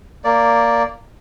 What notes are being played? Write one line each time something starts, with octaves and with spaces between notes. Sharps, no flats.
A#3 D5